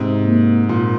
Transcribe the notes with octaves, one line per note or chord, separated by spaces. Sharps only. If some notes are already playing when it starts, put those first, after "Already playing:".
Already playing: G#2 C3
A#3
A#2